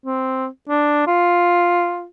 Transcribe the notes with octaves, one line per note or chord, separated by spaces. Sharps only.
C4
D4
F4